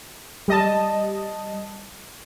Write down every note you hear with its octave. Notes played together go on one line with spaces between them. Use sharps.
G3 D#5 A5